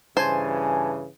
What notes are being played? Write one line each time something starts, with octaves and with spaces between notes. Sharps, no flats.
G2 C#3 E3 C5 G#5 A5